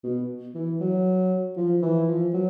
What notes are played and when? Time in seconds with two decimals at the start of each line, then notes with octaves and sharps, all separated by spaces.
0.04 B2
0.54 E3
0.80 F#3
1.57 F3
1.82 E3
2.08 F3
2.34 F#3